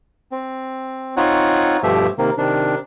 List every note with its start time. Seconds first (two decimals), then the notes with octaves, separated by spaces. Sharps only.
0.32 C4
1.17 C4 D#4 F4 C#5 F#5
1.83 G2 B2 F3 A3 G4 E5
2.18 C3 D#3 A#3
2.38 C3 D#3 D4